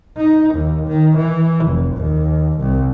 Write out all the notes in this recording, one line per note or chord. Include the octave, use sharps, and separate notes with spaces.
D#4
D#2
D#3
E3
F1
D#2
C2